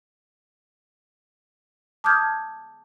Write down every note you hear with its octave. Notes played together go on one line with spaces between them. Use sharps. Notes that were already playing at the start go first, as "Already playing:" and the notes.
A5 D6 D#6 F6 G6 G#6